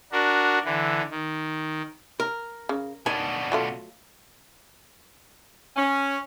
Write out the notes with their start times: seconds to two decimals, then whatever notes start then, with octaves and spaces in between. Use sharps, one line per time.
0.12 D4 F#4 A#4
0.65 D3 E3
1.10 D#3
2.20 A#4
2.69 C#3
3.06 B2 D#3 D4 G#5
3.52 F#3 A3 F4
5.76 C#4